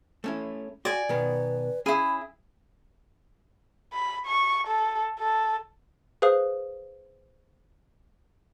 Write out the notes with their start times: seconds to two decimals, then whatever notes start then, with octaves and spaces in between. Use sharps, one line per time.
0.24 A3 C#4 E4
0.85 F#4 D5 G#5
1.09 B2 D#3 B3 B4
1.86 C#4 E4 G#4 F5 B5
3.93 B5
4.26 C#6
4.67 A4
5.20 A4
6.22 G#4 B4 C5 F5 D#6